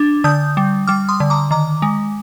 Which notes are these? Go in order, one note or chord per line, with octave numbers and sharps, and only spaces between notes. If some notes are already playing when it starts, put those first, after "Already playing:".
Already playing: D4
D3 D#6 G6
G3
G3 D6 F6
C6 D#6
D3
A#5 D6
D#3 A#5 D6
G#3